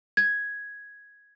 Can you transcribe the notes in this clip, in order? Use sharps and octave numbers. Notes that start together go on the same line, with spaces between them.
G#6